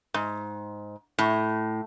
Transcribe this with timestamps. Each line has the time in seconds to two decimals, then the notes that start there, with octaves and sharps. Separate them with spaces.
0.14 G#2
1.19 A2